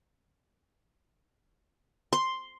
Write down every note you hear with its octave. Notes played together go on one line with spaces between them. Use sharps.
C6